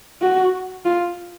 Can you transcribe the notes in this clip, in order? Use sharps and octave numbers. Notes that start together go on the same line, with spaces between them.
F#4
F4